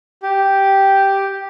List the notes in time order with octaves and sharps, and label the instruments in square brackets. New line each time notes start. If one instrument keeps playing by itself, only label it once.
[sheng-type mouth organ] G4